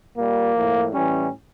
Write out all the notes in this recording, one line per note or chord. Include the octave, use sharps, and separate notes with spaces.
A#2 G3 A#3
A2 F3
A2 E3 G3 C#4